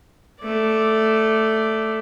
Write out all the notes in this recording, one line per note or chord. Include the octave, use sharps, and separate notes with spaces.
A3 D5